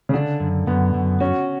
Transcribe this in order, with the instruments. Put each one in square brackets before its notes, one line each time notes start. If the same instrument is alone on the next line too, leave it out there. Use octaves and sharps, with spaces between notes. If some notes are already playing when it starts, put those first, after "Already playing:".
[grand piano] C#3
[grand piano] D3 [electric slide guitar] D4
[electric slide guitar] F#2
[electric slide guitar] F#2 [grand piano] B3
[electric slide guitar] F#2
[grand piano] C#4 [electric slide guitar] F#4